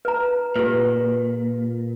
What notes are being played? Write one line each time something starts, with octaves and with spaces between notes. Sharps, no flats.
B4 A#5
A#2 G4 B4